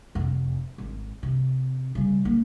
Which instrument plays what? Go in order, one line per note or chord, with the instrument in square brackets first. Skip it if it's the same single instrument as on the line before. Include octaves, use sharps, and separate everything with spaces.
[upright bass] F1 F2
G#1
C3
C#3 G3
F#3 A#3